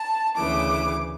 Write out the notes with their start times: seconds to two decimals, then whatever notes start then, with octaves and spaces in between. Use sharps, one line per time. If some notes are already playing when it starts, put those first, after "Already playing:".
Already playing: A5
0.35 D2 C#3 E3 D6